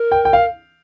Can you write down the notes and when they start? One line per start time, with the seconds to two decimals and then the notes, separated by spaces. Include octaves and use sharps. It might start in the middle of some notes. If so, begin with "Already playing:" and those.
Already playing: A#4
0.12 G5
0.25 G5
0.33 F5